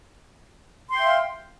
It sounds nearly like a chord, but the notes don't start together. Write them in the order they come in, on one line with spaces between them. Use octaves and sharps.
C6 G5 E5 F5